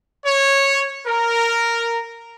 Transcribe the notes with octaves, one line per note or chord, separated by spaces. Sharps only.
C#5
A#4